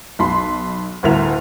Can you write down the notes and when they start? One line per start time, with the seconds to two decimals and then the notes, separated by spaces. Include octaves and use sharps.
0.19 B1 B5 C6
1.03 G1 D2 A2 A#4 E5 F7